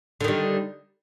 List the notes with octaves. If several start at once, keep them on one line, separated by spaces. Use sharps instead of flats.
D3 D#3 G3